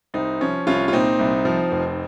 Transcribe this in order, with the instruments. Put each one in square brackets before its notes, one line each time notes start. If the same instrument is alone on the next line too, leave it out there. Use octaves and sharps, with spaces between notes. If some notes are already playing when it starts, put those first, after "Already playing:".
[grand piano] C2 C4 D#4
F3 C#4
C2 C#4 F4
F4
A#2 C4 D#4
C2
F3
F1